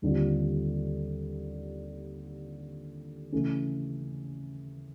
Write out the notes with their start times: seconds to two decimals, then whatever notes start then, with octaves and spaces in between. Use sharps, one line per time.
0.02 D#2 D3 G3 C4 F4
3.32 C#3 E3 A3 C#4